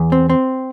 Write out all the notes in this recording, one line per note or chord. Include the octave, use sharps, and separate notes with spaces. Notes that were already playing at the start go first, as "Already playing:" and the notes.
Already playing: E2
C4
C4